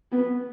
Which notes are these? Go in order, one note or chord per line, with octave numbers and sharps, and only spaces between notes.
B3